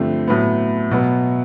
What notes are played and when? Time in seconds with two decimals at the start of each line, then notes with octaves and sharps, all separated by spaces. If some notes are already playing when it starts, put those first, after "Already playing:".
Already playing: G2 D3 F3 A3 C4
0.28 A2 F#3 B3
0.91 B2 F#3 B3